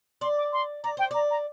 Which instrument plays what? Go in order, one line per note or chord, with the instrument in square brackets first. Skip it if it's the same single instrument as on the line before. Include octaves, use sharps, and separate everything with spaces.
[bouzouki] D5 [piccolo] C6
[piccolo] D6
C6
[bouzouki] D5 [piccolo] A#5
[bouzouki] C5 [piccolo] G5
[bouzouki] D5 [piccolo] A#5
[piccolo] A#5